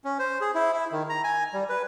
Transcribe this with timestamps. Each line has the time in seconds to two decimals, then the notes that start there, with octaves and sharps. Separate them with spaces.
0.05 C#4
0.19 C5
0.41 G#4
0.55 E4
0.73 E4
0.92 D#3
1.09 A#5
1.24 G#5
1.53 G3
1.69 B4